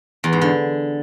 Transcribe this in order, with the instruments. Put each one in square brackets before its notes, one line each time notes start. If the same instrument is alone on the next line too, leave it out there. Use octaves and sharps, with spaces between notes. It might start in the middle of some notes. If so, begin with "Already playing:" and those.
[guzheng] E2
G#2
D3